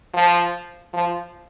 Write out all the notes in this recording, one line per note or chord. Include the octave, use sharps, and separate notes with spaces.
F3
F3